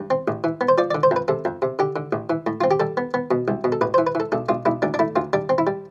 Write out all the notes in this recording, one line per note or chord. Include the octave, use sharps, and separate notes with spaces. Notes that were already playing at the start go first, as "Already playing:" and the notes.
Already playing: G2
C4
A1
E3
B3
C5
F3 D5
D5
D3
C5
F2 B4
C3 A4
F2
C3
D3 G4
D3
A1
E3
A2
C4 F4
G4
G3 A4
B3
B3
B2
C2
B2
A4
A1 B4
C5
E3
B4
E3 A4
B1 A4
B1 F4
B1 E4
D2 D4
D4
A3 E4
D2 F4
G3 D4
C4
E4
G3